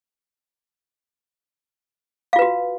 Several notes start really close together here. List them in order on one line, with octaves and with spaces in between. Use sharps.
F5 F4 B4 F#4